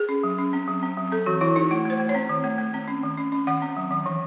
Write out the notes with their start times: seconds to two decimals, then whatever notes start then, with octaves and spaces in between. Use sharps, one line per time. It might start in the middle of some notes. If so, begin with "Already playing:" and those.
Already playing: G#4
0.09 C#4
0.24 F#3
0.38 C#4
0.53 C4
0.68 F#3
0.83 C4
0.97 F#3
1.12 C4 A4
1.26 E3 F#4
1.41 E3 E4
1.56 E3 D#4
1.71 A3 E4
1.85 A3 C5
2.00 A3
2.09 C#5
2.15 C4
2.29 D#3
2.44 A3
2.58 A3
2.74 C4
2.88 C#4
3.03 D#3
3.18 C#4
3.32 C#4
3.47 D#3 F#5
3.62 C4
3.77 F#3
3.91 D#3
4.06 E3